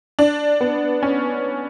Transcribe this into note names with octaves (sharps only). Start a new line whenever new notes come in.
D4
B3
C#4